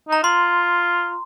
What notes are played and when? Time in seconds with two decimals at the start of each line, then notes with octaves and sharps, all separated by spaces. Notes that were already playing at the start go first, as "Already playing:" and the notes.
0.09 D#4 A#5
0.23 F4 C6